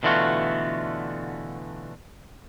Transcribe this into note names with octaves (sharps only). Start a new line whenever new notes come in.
B2 D3 E3 A3 F4 F#4